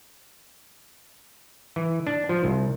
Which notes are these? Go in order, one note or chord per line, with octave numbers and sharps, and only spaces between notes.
E3
D4
F3
C2